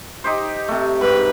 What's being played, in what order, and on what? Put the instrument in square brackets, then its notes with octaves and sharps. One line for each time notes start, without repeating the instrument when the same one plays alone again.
[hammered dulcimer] D#4 G4 C5
C3 A3
[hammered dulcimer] G#2 G4 [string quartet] B4